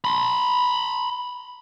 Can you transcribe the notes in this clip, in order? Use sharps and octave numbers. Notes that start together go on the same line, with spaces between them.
B5 C6